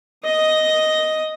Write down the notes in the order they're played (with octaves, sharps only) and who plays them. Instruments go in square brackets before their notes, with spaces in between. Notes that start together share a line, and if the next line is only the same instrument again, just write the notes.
[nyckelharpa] D#5 D#6